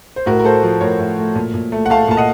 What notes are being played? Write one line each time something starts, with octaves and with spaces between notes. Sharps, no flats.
C5
A2 F#4 A#4
A#4
A3 A4 C5
F3
A2 A#4 C#5
A2
A3
A#2
A#2
A3
F#5
A3 F5 A5
A#2 A5
D#5 F#5